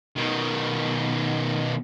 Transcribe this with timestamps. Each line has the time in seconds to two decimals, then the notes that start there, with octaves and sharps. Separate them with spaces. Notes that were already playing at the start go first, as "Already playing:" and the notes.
0.16 B2 D#3